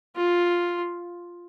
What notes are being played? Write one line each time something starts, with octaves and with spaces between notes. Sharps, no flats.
F4